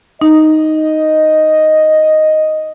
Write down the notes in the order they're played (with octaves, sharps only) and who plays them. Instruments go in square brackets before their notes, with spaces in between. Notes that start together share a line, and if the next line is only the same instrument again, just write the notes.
[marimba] D#4 [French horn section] D#5